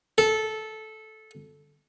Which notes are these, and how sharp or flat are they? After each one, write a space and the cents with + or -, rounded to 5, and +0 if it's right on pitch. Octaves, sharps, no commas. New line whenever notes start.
A4 -15